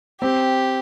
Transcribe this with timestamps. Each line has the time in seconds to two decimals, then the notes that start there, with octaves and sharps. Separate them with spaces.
0.21 C4 G4